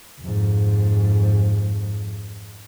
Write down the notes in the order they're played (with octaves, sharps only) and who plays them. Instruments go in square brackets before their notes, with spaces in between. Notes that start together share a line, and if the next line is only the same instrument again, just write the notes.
[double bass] F2 G#2